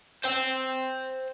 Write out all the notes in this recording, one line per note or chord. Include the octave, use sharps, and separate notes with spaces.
C5 G5